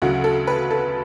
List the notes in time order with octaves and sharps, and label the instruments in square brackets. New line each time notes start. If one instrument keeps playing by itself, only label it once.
[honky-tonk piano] D2 C#3 F#3 F#4
A4
B4
A4